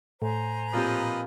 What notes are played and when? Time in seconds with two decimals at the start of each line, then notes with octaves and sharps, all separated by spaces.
0.22 A2 C5 G#5 A#5
0.73 A#2 F3 C4 G4 B4 D#5